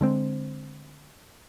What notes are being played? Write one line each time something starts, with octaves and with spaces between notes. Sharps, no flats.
D3 G#3 C4